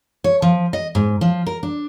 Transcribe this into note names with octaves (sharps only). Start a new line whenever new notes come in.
C#5
F3
D#5
G#2
F3
A#4
D4